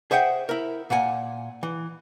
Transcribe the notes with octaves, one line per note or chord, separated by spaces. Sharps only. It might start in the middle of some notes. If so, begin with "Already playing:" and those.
G#4 C5 E5 F#5 G5
E4 A#4
A#2 A#3 F#5 G#5
E3